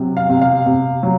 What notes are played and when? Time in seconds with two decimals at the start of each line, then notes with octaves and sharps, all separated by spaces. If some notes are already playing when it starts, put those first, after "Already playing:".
Already playing: C3 F#3
0.17 F5
0.29 C3
0.42 F5
0.66 C3
1.03 F#3